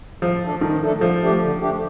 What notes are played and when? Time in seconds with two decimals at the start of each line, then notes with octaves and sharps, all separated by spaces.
0.22 A2 F3
0.42 A3 D4 A4
0.61 A2 D#3
0.82 A3 D4 A4
1.01 D3 F3
1.21 A3 D4 G4
1.41 D3
1.60 A3 D4 G4